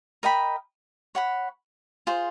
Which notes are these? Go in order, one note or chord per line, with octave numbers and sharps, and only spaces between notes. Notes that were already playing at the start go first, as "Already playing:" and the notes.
A#4 D#5 G5 B5
C#5 F#5 B5
F4 G#4 C5